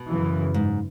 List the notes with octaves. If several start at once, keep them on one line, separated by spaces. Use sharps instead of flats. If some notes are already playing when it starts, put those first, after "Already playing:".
Already playing: B2
F#2 C#3 E3
G#2